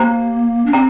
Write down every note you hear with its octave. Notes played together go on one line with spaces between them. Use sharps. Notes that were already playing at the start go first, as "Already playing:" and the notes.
Already playing: A#3 G4 C5 G5 A#5
D4
C4 G5 A#5